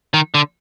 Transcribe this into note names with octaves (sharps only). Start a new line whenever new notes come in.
D#3
D3